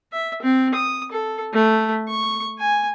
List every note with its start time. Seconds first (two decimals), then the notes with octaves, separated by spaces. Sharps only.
0.13 E5
0.42 C4
0.75 D#6
1.12 A4
1.54 A3
2.09 C#6
2.59 G#5